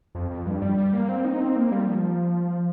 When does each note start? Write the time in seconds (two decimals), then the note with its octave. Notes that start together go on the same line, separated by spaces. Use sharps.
0.15 F2
0.30 F2
0.46 G2
0.62 G3
0.77 G3
0.93 A#3
1.09 C4
1.25 D#4
1.40 C4
1.56 A#3
1.72 G3
1.88 F3